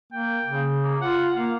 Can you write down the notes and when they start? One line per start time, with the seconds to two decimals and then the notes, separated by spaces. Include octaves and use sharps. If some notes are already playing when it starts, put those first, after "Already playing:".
0.12 A#3 G5
0.45 C#3
0.84 A#3
1.01 F4 F#5
1.36 A#3 F5